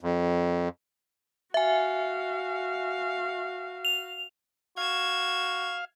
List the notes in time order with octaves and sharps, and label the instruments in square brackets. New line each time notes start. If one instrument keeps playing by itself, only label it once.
[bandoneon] F2
[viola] F#4 F5 [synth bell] E5 G#5
[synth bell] F7
[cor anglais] F#4 [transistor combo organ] F5 [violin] G#6 E7